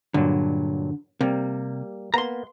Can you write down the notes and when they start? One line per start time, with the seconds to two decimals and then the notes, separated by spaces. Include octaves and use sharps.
0.14 G2 A#2 D3 F#3
1.21 C3 G3 A#3
2.14 A#3 B3 A#5 C6